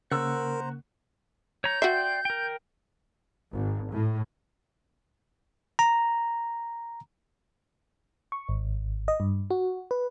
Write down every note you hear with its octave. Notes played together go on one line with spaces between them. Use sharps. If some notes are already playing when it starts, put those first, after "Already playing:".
C#3 A#3 A#4 C5 F#5 A#5 C#6 E6
C#5 A#5 G6
F#4 D5 E5 G5 C6
A#4 G5
G#1
A2
A#5
C#6
G#1
D#5
G2
F#4
B4